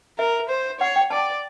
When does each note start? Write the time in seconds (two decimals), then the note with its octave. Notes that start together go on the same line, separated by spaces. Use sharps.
0.18 A#4 E5
0.49 C5
0.80 C#5 F#5
0.96 G5
1.10 D5 A5